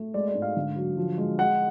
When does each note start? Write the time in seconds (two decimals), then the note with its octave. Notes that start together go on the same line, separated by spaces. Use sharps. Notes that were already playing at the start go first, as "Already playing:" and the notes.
Already playing: A3
0.14 G#3 D5
0.28 D5
0.35 G#2
0.42 F5
0.56 D3
0.76 F#3
0.97 F3
1.18 G#3
1.38 G#3 F#5